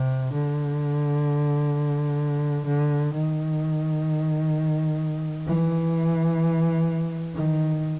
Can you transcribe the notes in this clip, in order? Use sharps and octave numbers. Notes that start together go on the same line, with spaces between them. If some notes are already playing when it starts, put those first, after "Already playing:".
Already playing: C3
D3
D3
D#3
E3
D#3